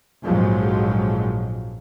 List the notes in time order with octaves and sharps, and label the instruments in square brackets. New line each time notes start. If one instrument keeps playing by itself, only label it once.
[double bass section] A#1 F2 G#2 F3 F#3 G#3